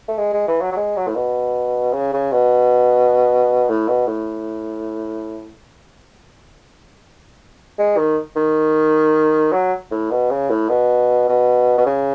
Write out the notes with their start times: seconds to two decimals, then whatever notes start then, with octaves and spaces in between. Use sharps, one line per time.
0.08 A3
0.18 G#3
0.33 G#3
0.48 E3
0.61 F#3
0.72 F#3
0.76 G#3
0.97 F#3
1.07 A2
1.15 B2
1.93 C#3
2.13 C#3
2.32 B2
3.69 A2
3.88 B2
4.07 A2
7.78 G#3
7.97 D#3
8.36 D#3
9.53 F#3
9.91 A2
10.11 B2
10.31 C#3
10.50 A2
10.69 B2
11.29 B2
11.78 B2
11.86 C#3